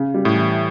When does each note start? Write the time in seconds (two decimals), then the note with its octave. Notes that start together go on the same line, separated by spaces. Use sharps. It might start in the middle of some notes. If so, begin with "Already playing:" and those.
Already playing: C#3
0.14 G3
0.25 A2
0.35 E3